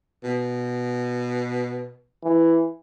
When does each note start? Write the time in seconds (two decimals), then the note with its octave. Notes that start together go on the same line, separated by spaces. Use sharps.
0.23 B2
2.24 E3